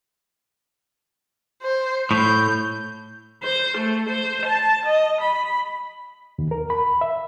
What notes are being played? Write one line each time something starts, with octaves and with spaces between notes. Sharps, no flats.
C5
A2 G6
C5
A3
C5
A5
D#5
B5
D#2
A#4
B5
E5